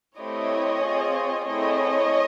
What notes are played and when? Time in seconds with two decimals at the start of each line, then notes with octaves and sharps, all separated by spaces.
0.18 A3 C4 E4 G4 C#5 D#5
0.84 C4 F4 G#4
1.48 A3 C4 E4 G#4 C#5 D#5